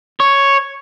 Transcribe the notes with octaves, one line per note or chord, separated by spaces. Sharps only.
C#5